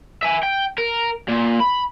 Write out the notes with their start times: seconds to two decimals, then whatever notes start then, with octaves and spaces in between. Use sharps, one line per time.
0.23 E5 G#5
0.43 G5
0.78 A#4
1.28 A#2
1.60 B5